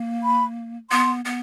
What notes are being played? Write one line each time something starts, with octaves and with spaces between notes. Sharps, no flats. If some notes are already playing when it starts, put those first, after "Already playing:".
Already playing: A#3
B5
B3 C6
B3